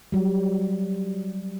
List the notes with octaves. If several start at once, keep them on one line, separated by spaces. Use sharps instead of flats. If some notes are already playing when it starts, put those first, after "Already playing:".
F#3 G3